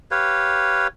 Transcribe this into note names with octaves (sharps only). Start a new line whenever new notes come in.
G4 B4 C#5 F5